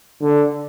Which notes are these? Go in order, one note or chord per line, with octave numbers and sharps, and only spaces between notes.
D3